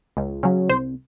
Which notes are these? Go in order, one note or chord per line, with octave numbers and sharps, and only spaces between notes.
C#2
C#3 F#3
C2 C5